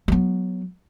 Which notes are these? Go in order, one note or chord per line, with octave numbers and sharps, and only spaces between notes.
F#3 B3